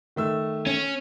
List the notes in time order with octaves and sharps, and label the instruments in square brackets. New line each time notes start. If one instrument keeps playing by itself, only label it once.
[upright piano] D#3 A3 E6
[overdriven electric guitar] C#4